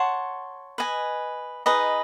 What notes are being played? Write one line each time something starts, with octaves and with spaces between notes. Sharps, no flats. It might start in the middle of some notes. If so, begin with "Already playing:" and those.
Already playing: C#5 F#5 A5 C6
B4 D#5 G#5
D#4 G#4 B4 D#5